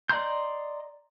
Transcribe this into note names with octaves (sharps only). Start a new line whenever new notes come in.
D5 D#5 A#5 C6 G6